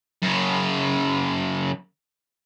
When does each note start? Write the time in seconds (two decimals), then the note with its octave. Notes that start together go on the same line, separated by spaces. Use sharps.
0.23 F#2 C#3